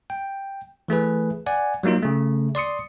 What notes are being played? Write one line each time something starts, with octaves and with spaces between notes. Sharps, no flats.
G5
E3 A3 G#4 B4
D5 F#5 G#5
F#3 G3 A#3 D#4 F4
C#3 A3
D5 C6 D#6 C#7